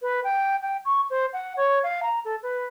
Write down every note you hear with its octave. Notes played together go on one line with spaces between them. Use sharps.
B4
G5
G5
C#6
C5
F#5
C#5
F5
A#5
A4
B4